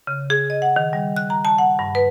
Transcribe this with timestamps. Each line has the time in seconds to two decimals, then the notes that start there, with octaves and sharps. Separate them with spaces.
0.07 C#3
0.30 G#4
0.50 D#5
0.62 F#5
0.76 D#3
0.93 G3
1.16 F#6
1.30 A#5
1.45 A5
1.58 F#5
1.79 G2
1.95 B4